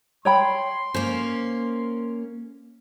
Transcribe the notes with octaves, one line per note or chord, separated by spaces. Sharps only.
C#5 G5 B5 C6
A#3 C#4 C5